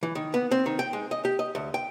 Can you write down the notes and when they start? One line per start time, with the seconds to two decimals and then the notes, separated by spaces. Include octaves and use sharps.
0.03 E3
0.15 D#3
0.34 B3
0.51 C4
0.66 D#3
0.79 G5
0.93 G#3
1.11 D#5
1.25 G4
1.39 D#5
1.55 D2
1.74 G5